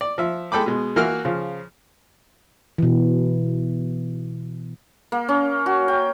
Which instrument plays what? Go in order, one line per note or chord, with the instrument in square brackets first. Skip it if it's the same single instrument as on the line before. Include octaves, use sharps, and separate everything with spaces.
[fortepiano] D5
F3 E5
G#3 A4 G5 B5 D6
B2 G#3
E3 A#3 F#4 A#4 E5 F6
C#3 F3
[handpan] B2 E3
[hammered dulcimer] A#3
C#4
F#4
G5